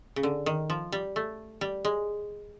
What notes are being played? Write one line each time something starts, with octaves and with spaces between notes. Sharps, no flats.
C#3
D3
D#3
F3
G3
A3
G3
G#3